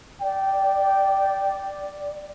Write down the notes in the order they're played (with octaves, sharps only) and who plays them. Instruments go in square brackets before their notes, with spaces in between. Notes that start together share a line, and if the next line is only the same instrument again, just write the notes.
[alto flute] D5 [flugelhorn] G5